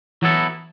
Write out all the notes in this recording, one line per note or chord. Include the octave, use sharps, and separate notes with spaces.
E3 F#3 B3 E4 A4